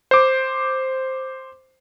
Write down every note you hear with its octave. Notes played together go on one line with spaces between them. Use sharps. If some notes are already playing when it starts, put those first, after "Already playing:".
C5 D6